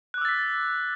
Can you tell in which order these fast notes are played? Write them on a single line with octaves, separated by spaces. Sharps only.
F#6 D6 E6 A6 B6